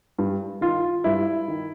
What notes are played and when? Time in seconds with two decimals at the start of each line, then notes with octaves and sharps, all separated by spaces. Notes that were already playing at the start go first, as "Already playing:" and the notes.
0.18 G2
0.61 D#3 F4
1.04 G2 E4
1.48 D#3